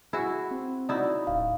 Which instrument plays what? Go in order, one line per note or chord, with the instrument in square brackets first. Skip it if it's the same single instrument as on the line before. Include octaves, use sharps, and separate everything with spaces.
[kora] E4 F#4 [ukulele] G#4
[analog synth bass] C4
[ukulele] C#4 F#4 D5 [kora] D#4 E4
[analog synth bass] D1 [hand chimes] F5